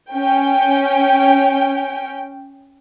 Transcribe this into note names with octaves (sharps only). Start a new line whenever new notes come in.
C#4 G5